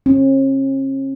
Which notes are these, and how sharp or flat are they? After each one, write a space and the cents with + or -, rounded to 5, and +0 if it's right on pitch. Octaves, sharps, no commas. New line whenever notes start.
C#4 -45